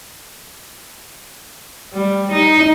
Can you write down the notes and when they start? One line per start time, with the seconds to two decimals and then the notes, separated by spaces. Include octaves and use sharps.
1.93 G3
2.32 D#4